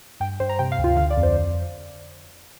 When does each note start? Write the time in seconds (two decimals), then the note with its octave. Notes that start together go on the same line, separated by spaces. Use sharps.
0.20 G2 G5
0.40 G2 C5
0.49 A#5
0.59 C3 G5
0.72 F5
0.78 D2
0.84 F4
0.97 D3 F5
1.10 D5
1.17 F2
1.23 C5